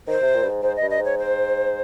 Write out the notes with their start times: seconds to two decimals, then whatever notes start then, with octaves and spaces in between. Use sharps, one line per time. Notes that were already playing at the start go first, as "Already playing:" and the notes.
0.07 D#3 C5
0.22 C3
0.35 A#2
0.43 G2
0.49 G#2
0.63 G#2 C5
0.77 D#5
0.82 G2
0.90 D#5
0.99 G#2
1.05 C#5
1.19 C5